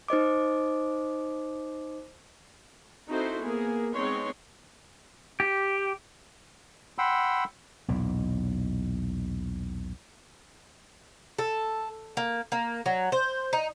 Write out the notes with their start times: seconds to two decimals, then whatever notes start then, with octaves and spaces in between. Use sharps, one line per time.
0.08 D#4 C5 D#5 D6
3.09 C4 D#4 E4 F#4 A4 C5
3.40 A#3 B3 G#4
3.94 G#3 B3 C4 D#4 C#5 C6
5.40 G4
6.98 F#5 G5 B5 C6 E6
7.88 B1 E2 A#2
11.38 A4
12.17 A#3
12.52 A#3
12.86 F#3
13.12 C5
13.53 D#4